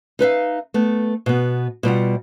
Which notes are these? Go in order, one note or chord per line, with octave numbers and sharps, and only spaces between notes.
D#4 B4 E5 F5
A3 B3
B2 B3
B2 G3 F4 F#5